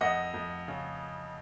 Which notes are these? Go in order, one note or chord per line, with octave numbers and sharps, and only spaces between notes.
F2 D#5 F#5
F2
C#3